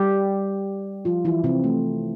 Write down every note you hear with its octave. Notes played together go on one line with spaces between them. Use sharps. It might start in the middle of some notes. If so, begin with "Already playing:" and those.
Already playing: G3 G4
F3 F4
E3 E4
C3 C4
A3